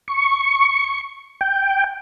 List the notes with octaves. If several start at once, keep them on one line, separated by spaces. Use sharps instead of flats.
C#6
G5